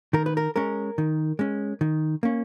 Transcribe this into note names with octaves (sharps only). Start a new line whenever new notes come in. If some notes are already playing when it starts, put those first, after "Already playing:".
D#3 A#4
B4
A#4
G#3 C#4 A#4
D#3
G#3 C#4
D#3
A#3 C#4